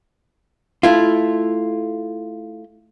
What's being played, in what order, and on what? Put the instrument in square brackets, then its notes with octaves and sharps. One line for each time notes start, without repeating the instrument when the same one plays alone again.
[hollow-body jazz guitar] A3 E4 F4